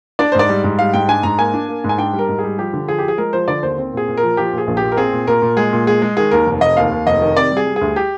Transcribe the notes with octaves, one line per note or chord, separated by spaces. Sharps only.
D4 D5
C5
G#2 D5
G3
G#2
G3 F5
G#2 G5
D4 G#5
G#2 A#5
A#3 G#5
D4
A#3
G#2
G#5
D4 G5
G3
A#4
G#2
G3 G#4
F3 G4
D3
F3 G#4
F3 G4
G#4
G#3 A#4
F3 C5
D3 D5
D#2 C5
C4
A#2 G#4
A#2
A#4
F3
F3 G4
A#2 G#4
A#1
G4
A#2
A#4
C4 G#4
A#2
A#2 A#4
A#2
G#3 G#4
A#2
G#3 G#4
G#3
D#3 G#4
D#2 A#4
F1
F1 D#5
D#2 F5
D#2
F1 D#5
D#3
C3 D5
G3
G#4
G3
D2 G#4
G4